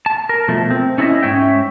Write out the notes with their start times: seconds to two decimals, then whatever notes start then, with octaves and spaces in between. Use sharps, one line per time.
0.06 A5
0.29 A#4
0.48 B2 F3 A3
0.71 C4
0.98 C#4 E4 A4 C5 D#5 E5
1.23 G#2 C#4 C#5 E5 G5